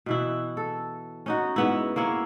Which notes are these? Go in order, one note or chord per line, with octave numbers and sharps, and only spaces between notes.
B2 E3 E4
A4
C#4 D#4 F#4
G#2 B3 E4
A#3 C#4 E4 C#5